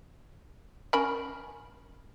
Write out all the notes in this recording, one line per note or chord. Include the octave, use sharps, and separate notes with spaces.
C#4 A#4 B5